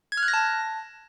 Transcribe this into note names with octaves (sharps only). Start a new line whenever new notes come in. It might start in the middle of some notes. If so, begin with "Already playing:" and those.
G#6
F6
F#6
A#6
A5